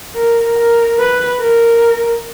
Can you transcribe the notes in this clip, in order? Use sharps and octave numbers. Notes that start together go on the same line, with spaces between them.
A#4
A#4
B4
A#4